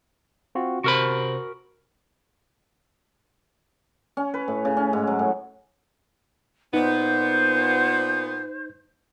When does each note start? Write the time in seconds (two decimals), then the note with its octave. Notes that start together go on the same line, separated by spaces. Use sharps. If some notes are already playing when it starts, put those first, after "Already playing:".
0.55 C4 F4 F#4
0.84 C3 F#4 A#4 C5 B5
4.17 C#4
4.34 B4
4.48 A2
4.65 C#3
4.77 C#4
4.93 G#2
5.07 F#3
5.19 A2
6.74 A#2 B3 D#4 C5